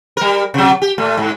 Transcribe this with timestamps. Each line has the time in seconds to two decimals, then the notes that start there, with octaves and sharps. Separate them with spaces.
0.17 G3 A#4
0.54 C3 F#3
0.82 G4
0.98 A#2 A3
1.17 G#2